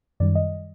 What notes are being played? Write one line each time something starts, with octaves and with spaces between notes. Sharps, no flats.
F#2 D#3 G3 D5
D#5